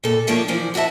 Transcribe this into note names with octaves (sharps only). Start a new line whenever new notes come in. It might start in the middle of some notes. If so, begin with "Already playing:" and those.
A#2 A4
D#3 F3 A3 A#3 D4 C#5
A#2 E3 F3 D5
D2 F#4 D5 E5 A5